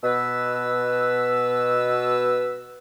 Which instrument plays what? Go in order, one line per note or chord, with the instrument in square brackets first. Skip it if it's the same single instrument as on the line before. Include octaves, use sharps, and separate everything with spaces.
[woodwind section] B2 B4 E6